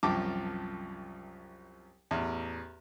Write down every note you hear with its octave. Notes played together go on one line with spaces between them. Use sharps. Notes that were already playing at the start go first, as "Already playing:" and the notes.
C2 F#2 F3 G5 A5 D6
A1 E2